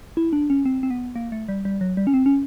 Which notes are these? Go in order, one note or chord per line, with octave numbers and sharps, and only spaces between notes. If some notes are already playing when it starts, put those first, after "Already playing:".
E4
D4
C#4
C4
C4
B3
A#3
A3
G3
G3
F#3
G3
C#4
C4
C#4